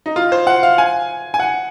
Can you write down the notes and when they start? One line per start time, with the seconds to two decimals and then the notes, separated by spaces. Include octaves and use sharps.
0.06 D#4
0.16 F4
0.32 C5
0.47 F#5
0.63 F5
0.78 G#5
1.34 G#5
1.40 F#5